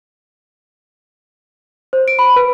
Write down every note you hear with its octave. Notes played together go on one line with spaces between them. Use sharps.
C5
D7
B5
B4